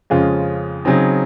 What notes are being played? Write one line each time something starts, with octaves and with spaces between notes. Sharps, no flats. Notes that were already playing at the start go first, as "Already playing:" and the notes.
F2 C#3 G#3 C#4 F4
C#3 F#3 C4 D#4